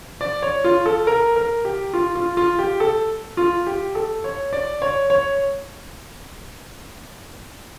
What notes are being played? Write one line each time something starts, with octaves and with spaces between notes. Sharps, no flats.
D5
C#5
F4
A4
A#4
A#4
G4
F4
F4
F4
G4
A4
F4
G4
A4
C#5
D5
C#5
C#5